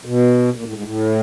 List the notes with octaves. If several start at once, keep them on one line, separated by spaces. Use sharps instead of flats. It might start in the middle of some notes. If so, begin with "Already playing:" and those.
B2
A#2
A2
G#2
A2